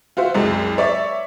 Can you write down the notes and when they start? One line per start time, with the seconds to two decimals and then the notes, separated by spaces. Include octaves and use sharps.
0.17 F4 F#4 C5 E5
0.34 C2 F#2 G#3
0.78 C#5 D5 E5